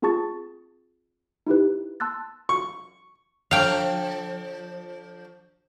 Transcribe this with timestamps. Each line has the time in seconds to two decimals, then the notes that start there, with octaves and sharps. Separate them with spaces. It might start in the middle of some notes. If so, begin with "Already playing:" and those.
0.02 C4 F4 G#4 A5 C#6 A6
1.47 D#4 E4 G4 B4
2.00 A5 C6 E6 F#6 A6
2.49 C#6
3.51 F3 D4 A4 F5 G5